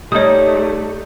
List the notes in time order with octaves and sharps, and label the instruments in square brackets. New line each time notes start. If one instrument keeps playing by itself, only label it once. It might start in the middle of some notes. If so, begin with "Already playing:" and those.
[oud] G3 D#4 [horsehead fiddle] A3 [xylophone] C#5 D#6